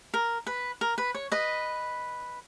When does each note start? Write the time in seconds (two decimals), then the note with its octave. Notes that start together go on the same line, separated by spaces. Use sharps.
0.14 A#4
0.47 B4
0.81 A#4
0.98 B4
1.15 C#5
1.32 B4 D#5